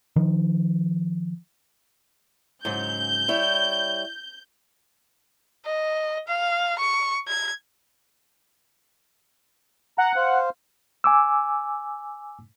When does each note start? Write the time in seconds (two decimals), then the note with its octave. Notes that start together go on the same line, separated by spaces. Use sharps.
0.16 D#3 F3
2.65 G#2 C#3 F#3 G6
3.28 G3 E4 C#5
5.66 D#5
6.28 F5
6.79 C#6
7.28 G#6
9.98 F#5 A#5
10.16 C5 F5
11.04 G#5 D6 E6